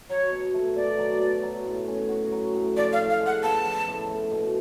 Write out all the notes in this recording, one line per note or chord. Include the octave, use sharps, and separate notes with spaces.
F#3 C#5
B2
A3
B2 D5
F#3
B2
F#3
A2
C#4
F#4
F#3
A2
F3 D5
F5
A2
F5
G#3
F#5
B3 A5
F3
A2
A3
B2